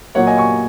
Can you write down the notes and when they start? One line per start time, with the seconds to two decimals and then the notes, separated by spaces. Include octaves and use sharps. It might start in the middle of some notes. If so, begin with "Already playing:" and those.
0.15 A#2 F#3 A#3 C#5 F#5
0.27 D#5 G#5
0.38 G#5 C#6